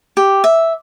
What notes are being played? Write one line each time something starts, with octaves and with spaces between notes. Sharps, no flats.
G4
E5